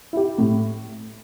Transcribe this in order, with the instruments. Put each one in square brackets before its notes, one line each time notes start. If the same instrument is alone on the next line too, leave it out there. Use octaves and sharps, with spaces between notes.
[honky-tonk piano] E4 G4
A2